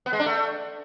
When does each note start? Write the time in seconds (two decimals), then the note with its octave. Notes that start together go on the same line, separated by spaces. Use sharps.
0.06 B3
0.13 G#3
0.20 D4
0.26 A3